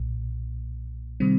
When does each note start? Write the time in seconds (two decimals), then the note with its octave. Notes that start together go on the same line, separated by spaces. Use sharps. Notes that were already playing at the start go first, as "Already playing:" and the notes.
Already playing: B1 A#2
1.20 C3 D#3 G3 C4